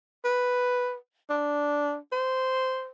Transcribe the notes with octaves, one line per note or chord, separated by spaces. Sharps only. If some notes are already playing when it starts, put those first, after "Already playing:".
B4
D4
C5